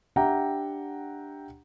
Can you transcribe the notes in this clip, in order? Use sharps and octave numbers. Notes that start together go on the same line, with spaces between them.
D4 G4 E5 F#5 G5 A#5